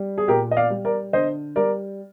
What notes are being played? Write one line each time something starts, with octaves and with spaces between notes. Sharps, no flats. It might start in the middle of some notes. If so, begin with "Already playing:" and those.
Already playing: G3
G#4
A#2 G4 A#4
D#5
D5 F5
G3
A#4 D5
D3 C5 D#5
G3 A#4 D5